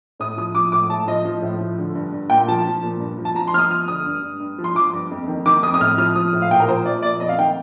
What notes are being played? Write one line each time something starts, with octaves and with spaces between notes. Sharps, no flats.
A2 D#6
F3 D#6
F3 D6
A2 D6
A2 A5
F3 D#5
F3
A2
F3
D3
G2
G2
A#2 G5
F3 A5
F3
A#2
G2
F3
A5
F3 A#5
C6
G2 F6
D#6
F3 F6
D3 D#6
G2
G2
G2
F3
C6
F3 D6
G2
F2
D#3
D#3 D6
F2 D#6
D#6
A2 F6
F3 F6
F3 D#6
A2
F5
A#2 G5
A#4
F3 C5
F3 D5
A#2 D5
F2 D#5
F5
D#3 G5